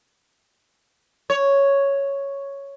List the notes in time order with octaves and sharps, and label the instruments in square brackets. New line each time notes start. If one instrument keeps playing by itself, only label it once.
[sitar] C#5